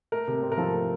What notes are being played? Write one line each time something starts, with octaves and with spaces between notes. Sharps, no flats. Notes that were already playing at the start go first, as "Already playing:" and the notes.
A3 A#4
C3
C4
A#4
F3 A4
A3